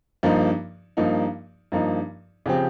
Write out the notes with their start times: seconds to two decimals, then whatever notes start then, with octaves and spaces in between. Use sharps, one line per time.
0.23 G2 F3 A#3 D#4
0.97 G2 F3 A#3 D#4
1.72 G2 F3 A#3 D#4
2.46 C#3 F3 C4 G4